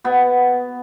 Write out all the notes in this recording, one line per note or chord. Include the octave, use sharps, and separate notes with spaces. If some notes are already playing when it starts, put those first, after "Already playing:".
B2 B3